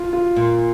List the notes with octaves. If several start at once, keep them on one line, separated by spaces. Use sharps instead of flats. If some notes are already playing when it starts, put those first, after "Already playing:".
Already playing: F4
F4
A#2